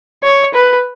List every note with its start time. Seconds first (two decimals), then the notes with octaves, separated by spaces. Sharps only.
0.23 C#5
0.54 B4